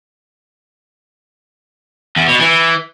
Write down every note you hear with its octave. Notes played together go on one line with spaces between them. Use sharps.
E2
B2
E3